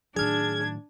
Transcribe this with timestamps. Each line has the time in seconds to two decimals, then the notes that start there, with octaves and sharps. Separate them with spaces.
0.16 A2 D#3 F#3 D4 G#4 F6 G#6